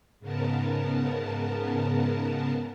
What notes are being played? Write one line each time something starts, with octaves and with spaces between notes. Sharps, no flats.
G#2 C#3 B3 A#4 A5